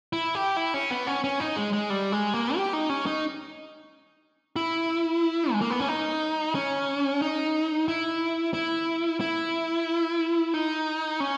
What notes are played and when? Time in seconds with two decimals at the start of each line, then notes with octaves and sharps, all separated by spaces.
0.13 E4
0.35 G4
0.57 E4
0.74 C#4
0.91 B3
1.07 C#4
1.24 C#4
1.40 D#4
1.56 G#3
1.73 G#3
1.90 G3
2.12 G#3
2.34 A#3
2.56 G4
2.73 D#4
2.89 C#4
3.06 D#4
4.56 E4
5.52 G#3
5.61 A#3
5.70 B3
5.80 C#4
5.88 D#4
6.55 C#4
7.22 D#4
7.88 E4
8.54 E4
9.21 E4
10.54 D#4
11.20 C#4